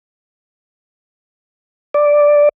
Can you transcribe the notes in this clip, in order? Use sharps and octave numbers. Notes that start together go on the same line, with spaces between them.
D5